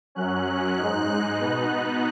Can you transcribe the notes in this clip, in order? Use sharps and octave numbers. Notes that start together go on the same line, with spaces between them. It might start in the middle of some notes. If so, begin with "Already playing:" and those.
F#2 F#3 C#4 F#6
G#2 G#3 D#4
B2 B3 D#4